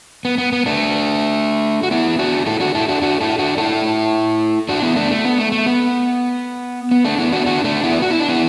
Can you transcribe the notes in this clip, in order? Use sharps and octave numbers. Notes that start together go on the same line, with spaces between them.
B3
B3
B3
A3 D4
F#4
B3 E4
D4 F#4
E4 A4
D4 F#4
E4 A4
D4 F#4
D4 F#4
E4 A4
D4 F#4
E4 A4
D4 F#4
B3 E4
A3 D4
A3
B3
A3
A3
B3
B3
A3 D4
B3 E4
D4 F#4
D4 F#4
A3 D4
B3 E4
F#4
E4
D4
B3 E4